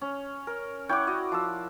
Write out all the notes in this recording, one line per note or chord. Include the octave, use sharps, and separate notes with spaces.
C#4
A#4
E4 C#5 F#5 G5 D6
F#4 D5 D#5
F3 E6